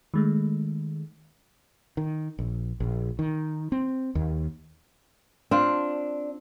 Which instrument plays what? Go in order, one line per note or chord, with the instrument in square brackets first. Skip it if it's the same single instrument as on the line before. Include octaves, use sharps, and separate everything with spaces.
[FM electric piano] D#3 G#3 A3
[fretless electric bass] D#3
A#1
A#1
D#3
C4
D#2
[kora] C4 F4 [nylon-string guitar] D4